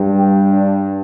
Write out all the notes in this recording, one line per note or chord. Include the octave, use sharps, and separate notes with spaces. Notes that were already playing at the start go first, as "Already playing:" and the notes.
Already playing: G2 G3
G4
D4